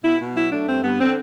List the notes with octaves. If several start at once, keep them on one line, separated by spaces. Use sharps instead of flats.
B2 E4
B2
F#3 E4
A3 D4
G2 C4
G2 B3
D3 C4